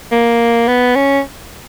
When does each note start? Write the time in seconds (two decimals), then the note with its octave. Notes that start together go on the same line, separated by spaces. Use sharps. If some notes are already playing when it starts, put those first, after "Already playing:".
0.11 A#3
0.68 B3
0.96 C#4